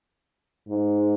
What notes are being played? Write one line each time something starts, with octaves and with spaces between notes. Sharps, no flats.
G#2